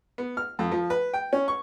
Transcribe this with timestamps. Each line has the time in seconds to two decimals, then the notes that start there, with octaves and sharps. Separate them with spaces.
0.18 B3
0.37 F6
0.59 F2
0.72 F3
0.90 B4
1.14 G5
1.33 C#4
1.48 C#6